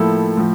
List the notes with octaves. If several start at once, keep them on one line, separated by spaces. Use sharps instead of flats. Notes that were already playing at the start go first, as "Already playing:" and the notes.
Already playing: A2 F3 A#3 E4 A4
A2 F3